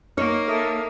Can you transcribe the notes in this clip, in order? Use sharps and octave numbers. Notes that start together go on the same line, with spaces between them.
A#3 D#4 C#5 F6
A4 A#4 E5 D#6